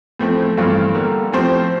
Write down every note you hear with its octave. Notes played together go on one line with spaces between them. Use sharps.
A2 F3 A3 C4
G2 E3 A3 C4 F4
D3 G3 A#3
A2 F3 C4 G4 C5